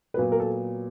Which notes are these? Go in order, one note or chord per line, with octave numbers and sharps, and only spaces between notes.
A#2 F#3 B3 B4
A#4
A4